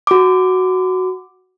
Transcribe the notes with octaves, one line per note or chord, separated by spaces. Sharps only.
F#4 D6